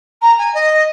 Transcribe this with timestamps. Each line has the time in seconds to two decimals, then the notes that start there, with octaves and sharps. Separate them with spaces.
0.22 A#5
0.38 G#5
0.54 D#5